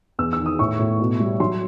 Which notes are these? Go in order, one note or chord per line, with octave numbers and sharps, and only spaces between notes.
E2 E6
E6
D#3
D#6
A2 C#6
A2
B2
G3
F#3 C6